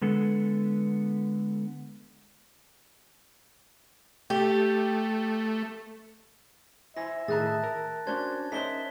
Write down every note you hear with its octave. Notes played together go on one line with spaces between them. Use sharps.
D3 G#3 B3 A4
A3 G4
E4 C5 E5 G#5 A#6
A2 D#3 G#4 A5 A#5 D#6 F#6 A6
A#4
C#4 D4 F#4 C5 G#6
C#4 D#4 A#4 C5 C#5 E5 B6 G7